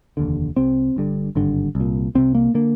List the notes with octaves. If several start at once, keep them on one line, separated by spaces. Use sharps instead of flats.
F1 D#2 D3
C2 C3 C4
G1 G2 D3
G#1 G2 D3
C2
A#2
C2 C3 C4
A#3
D3 A#3